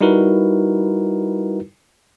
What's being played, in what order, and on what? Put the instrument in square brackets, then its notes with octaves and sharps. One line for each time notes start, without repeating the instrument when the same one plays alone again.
[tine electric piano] G3 D#4 E4 F#4 A#4 B4